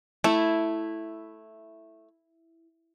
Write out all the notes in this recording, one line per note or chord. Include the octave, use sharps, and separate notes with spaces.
A3 E4